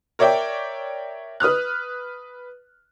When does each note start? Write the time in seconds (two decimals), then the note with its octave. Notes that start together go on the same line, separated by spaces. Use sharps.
0.19 A#4 C#5 D5 E5 G5
1.40 B4 D#6 F6 F#6